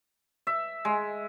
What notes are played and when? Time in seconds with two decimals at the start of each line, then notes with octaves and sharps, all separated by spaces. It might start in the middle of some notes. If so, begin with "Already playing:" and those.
0.47 E5
0.85 G#3